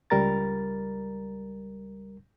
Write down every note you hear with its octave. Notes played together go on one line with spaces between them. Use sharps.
C#2 G3 A#4 A#5 A6